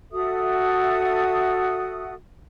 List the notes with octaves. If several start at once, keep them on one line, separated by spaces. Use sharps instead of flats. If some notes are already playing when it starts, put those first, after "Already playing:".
F#4 A4 E5 D#6